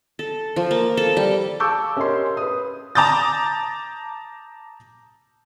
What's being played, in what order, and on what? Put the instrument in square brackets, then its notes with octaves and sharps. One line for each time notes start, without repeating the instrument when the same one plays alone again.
[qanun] A4
F3
A#3
A4
G3
[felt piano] F5 A5 C#6 D6 E6 G6
C#4 G4 A#4 D#5 G#5 C6
B4 D#6
[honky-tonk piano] A5 A#5 D6 D#6 G6 A6